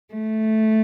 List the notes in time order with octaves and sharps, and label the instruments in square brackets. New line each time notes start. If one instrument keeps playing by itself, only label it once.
[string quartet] A3